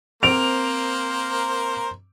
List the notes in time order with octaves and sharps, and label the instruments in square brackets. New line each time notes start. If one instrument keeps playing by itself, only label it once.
[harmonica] A#3 A#4 C5 [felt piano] C4 [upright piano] D7 F7